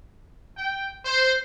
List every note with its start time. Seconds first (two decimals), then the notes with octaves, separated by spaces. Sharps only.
0.56 G5
1.06 C5